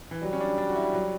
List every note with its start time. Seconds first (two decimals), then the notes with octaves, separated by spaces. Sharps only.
0.11 E3
0.23 F#3 G3
0.33 C#4
0.41 D4
0.58 D4
0.70 F#4
0.76 E4
0.93 F#3